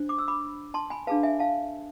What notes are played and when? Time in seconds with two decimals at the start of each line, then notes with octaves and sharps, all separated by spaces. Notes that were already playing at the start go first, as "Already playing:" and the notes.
Already playing: D4 C5
0.09 D6
0.18 E6
0.28 B5 D6
0.74 A5 C6
0.90 G#5 B5
1.07 D4 G#4 B4 F5 A5
1.23 E5 G#5
1.39 F5 A5